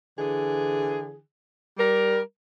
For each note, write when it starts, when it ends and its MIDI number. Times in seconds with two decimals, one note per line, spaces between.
0.19 1.19 50
0.19 1.19 52
0.19 1.19 68
1.78 2.19 55
1.78 2.19 70